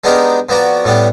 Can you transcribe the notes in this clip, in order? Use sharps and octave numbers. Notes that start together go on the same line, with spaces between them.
G#3 B3 D4 D#4 G4 A#4
F2 B3 F#4 D5 A#5
A2 G3 B3 D4